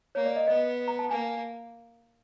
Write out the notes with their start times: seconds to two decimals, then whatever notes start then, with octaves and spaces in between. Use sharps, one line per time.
0.15 A#3 C#5
0.25 D5
0.36 D#5
0.47 B3 D#5
0.88 A#5
0.99 A5
1.10 A#3 G#5